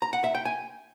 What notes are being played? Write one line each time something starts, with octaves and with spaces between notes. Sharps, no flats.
A#5
F#5
E5
G5
G#5